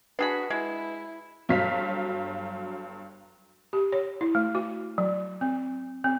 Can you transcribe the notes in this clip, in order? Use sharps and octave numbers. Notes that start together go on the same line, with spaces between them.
D4 F#4 G#4 B4 B5
G#3 E4
G1 G2 F#3 F5 B6
G4
C#5
E4
A3
F#4
F#3
C4
C4